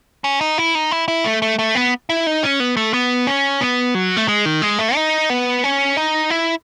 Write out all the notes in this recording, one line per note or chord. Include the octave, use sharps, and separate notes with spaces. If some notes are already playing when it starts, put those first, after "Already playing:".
C#4
D#4
E4
D#4
E4
E4
A3
A3
A3
B3
E4
D#4
C#4
B3
A3
B3
C#4
B3
F#3
A3
G#3
D#3
G#3
A3
D#4
B3
C#4
D#4
E4